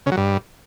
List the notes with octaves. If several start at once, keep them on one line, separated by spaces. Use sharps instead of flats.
C#3
F#3
G2